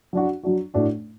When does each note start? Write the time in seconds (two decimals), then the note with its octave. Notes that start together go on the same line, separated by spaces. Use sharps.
0.13 F#3 D4 F#4
0.43 F#3 D4 F#4
0.74 A2 A3 D4 F#4